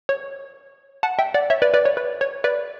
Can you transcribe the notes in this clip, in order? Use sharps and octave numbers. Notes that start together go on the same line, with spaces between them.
C#5
F#5 A5
E5 G5
D5 F#5
C#5 E5
B4 D5
B4 D5
C#5
B4
C#5
B4 D5